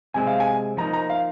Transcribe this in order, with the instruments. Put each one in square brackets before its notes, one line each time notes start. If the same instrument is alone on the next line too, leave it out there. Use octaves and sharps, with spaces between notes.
[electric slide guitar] C3 G#3 C4 [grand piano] G#5
[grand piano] F5
G#5
[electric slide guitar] F3 A#3 D#4 [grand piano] A#5
[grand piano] A#5
F5